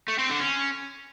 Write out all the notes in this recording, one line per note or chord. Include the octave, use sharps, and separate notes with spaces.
A3
C4
D3
C#4